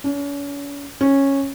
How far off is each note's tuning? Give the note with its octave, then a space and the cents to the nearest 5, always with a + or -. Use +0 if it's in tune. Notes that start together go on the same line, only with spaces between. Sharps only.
C#4 +40
C#4 -10